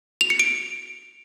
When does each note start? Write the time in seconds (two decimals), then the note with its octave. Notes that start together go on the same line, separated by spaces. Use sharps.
0.21 F7
0.30 C#7
0.39 D7